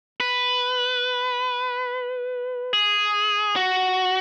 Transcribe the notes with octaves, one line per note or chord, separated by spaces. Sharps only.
B4
G#4
F#4